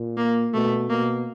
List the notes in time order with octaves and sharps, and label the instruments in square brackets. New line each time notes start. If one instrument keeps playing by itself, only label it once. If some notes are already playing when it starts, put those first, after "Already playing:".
Already playing: [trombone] A#2
[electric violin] A#3
[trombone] B2 [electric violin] A3
[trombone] B2 [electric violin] A#3